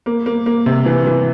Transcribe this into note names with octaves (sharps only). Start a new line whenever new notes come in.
A#3
A#3
A#3
C3
E3
E3